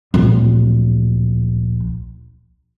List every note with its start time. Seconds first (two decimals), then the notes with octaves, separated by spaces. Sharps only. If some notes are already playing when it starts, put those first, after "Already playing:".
0.14 D1 A#1